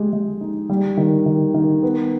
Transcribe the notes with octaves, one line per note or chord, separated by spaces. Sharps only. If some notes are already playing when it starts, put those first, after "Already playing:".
Already playing: G#3 G4
G#3
D#4
G3
D#3
D#3
D#3
B3